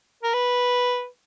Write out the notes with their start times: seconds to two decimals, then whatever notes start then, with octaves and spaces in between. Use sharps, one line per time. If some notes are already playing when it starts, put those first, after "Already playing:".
0.23 A#4
0.34 B4